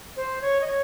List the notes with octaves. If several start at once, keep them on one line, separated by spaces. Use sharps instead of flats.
C5
C#5
D#5
C#5